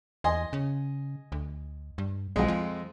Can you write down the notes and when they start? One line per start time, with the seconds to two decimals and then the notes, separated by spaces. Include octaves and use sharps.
0.24 E2 D#5 G#5 C6
0.53 C#3
1.32 D2
1.98 G2
2.36 B1 F2 G#3
2.48 F3